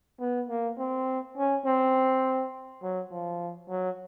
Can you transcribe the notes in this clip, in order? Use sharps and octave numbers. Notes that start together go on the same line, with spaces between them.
B3
A#3
C4
C#4
C4
F#3
F3
F#3